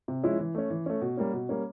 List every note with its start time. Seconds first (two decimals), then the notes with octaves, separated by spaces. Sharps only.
0.08 C3
0.23 F3 G#3 C#4 E4
0.39 E3
0.55 A3 C#4
0.70 E3
0.86 A3 C#4
1.01 B2
1.17 G3 A#3 C#4
1.33 B2
1.49 G3 A#3 C#4